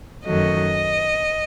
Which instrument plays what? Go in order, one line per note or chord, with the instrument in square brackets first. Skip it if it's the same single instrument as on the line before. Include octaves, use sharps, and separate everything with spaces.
[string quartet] F#2 D#3 F#3 A3 D#5